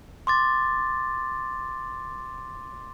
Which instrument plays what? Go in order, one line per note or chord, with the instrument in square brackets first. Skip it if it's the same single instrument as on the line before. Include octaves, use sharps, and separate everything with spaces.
[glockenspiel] C6 D6 A6